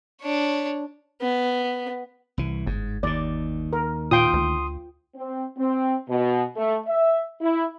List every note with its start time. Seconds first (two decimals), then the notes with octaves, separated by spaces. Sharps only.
0.21 D4 C#5
1.21 B3
2.38 C2 E3
2.66 G1 G#2
3.03 D#2 D#3 D5
3.73 A#4
4.11 A#2 F4 G5 C6 D#6
4.34 D2
5.15 C4
5.57 C4
6.08 B2
6.57 A3
6.86 E5
7.41 E4